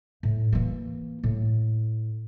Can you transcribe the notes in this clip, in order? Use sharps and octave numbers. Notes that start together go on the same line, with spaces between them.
A2
E3 A#3
A2